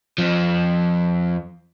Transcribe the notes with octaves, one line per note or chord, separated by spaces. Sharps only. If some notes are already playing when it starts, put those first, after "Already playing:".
F2 F3